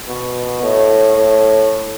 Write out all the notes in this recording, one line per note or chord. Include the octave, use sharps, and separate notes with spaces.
B2
A2
A2